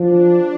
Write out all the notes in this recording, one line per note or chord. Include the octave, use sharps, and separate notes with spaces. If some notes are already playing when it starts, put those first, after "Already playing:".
Already playing: F3 D4